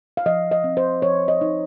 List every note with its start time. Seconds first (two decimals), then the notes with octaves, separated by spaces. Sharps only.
0.17 F5
0.26 F3 D#5
0.51 D#5
0.64 C4
0.77 C5
1.02 F3 C#5
1.28 D#5
1.41 D#4